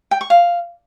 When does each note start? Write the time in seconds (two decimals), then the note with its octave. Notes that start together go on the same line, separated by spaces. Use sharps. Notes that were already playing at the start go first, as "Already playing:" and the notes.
0.11 G5
0.21 C#6
0.30 F5